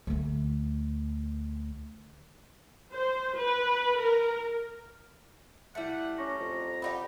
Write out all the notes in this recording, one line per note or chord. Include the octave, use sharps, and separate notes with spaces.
D2 A3
C5
B4
A#4
G3 A3 E4 F#5 C#7
C#4 A#5 C#6 D6
F2
D#4 F4 G4 D5 F#5 B5